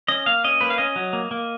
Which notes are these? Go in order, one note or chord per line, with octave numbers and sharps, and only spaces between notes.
C#4 D#5
A#3 F5
C#4 D#5
A#3 B4
F5
C#4 D#5
F#3
A#3
A#3